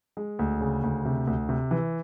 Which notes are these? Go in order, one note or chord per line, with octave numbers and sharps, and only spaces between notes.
G#3
D2
C#3
D2
C3
D2
C3
E3